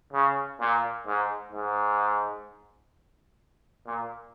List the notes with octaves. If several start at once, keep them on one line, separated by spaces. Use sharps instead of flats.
C#3
A#2
G#2
G#2
A#2